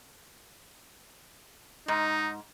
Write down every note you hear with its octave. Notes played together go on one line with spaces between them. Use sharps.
G#2 D#4